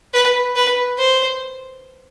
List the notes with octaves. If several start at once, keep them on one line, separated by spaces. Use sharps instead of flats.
B4
B4
C5